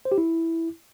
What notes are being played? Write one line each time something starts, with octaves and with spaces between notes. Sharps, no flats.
C5
G4
E4